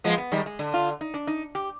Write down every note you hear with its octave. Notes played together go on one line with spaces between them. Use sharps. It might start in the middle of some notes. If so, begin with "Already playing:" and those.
F3 G#3 B3
B3
D#3 G3 G#3
G#3
D3
F4
D#4
D4
D#4
G4